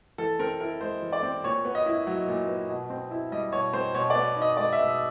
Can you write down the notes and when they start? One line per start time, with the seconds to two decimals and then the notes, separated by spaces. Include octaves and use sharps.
0.18 E3 A4
0.39 C4 A#4
0.60 E4 A#4
0.81 G#3 C5
1.02 E3
1.13 D5
1.23 C4
1.44 A#2 C#5
1.65 B3
1.75 D#5
1.86 E4
2.07 F#3
2.27 A#2
2.48 B3
2.69 B2
2.90 C4
3.11 E4
3.32 G3 D#5
3.52 B2 C#5
3.73 C4 C5
3.94 B2 C#5
4.10 B3 D5
4.36 D#4
4.42 D#5
4.57 G#3 D5
4.73 E5
4.78 B2
4.88 D#5